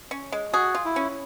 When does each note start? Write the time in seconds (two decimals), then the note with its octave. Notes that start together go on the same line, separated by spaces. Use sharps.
0.11 C#4
0.32 G#3
0.53 F#4 G#4
0.75 F4
0.85 E4
0.96 C#4